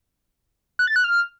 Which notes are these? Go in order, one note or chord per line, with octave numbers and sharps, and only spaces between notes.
F#6
A6
F#6
F6